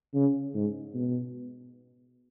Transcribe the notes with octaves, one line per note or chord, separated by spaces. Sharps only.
C#3
G#2
B2